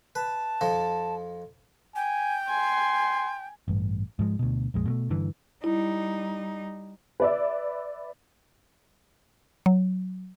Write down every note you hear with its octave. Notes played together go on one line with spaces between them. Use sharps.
B4 A5
F2 F3 D#4
G5 G#5
G#5 C6
A1 G2
G#2 F3 G#3
D2 B2
A#1 F2 G#3
B2 G#3 A3
G2 D3 E3
G3 D#4 E4
B4 D5 E5
F#3